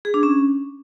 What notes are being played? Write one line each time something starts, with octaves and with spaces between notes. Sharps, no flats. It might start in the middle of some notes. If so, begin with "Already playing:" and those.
G#4
D4
C#4